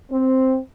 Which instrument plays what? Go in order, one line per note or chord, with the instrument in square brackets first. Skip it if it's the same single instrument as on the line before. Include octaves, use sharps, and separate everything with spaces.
[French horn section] C4